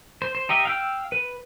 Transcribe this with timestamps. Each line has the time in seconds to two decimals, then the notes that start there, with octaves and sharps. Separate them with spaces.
0.22 C5
0.35 C5
0.49 D#4 G4 D#5 E5
0.65 F5 G5 E6
1.12 B4